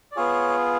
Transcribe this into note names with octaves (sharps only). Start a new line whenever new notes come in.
D5
B3 F4 G#4 C#5